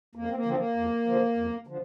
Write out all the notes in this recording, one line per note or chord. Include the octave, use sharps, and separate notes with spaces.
F2 A#3
C4
A#3
D3 F3 C4
A#3
F2
D3 F3
F2
D3 F3